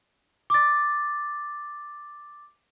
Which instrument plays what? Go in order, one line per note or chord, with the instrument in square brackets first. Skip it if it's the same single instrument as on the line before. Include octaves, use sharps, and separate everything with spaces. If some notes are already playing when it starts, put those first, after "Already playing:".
[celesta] D6 A6